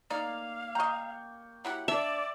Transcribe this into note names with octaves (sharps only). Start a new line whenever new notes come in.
A#3 D#4 D5 F5
D#5 G5 A#5 C#6
F#3 E4 G4 F#5
D4 D5 E5